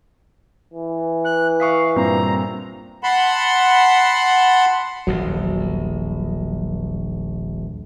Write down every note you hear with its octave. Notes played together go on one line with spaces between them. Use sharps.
E3
F#6
F5 C#6 D#6 B6
G2 A#2 C4 A#5
F#5 A5 B5 C6
D#1 A#1 E2 F#3